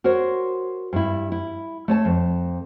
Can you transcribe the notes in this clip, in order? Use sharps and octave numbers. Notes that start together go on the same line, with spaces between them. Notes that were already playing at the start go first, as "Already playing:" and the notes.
F#4 A#4 C5 C#5
G2 E4
E4
A3 C#5 A5
F2